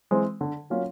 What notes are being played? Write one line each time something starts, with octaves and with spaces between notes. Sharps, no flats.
E3 G#3 C4
D3
F#3 A#3 C#4 F4